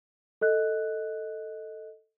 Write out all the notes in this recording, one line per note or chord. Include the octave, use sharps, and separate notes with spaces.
A4 D#5 F#6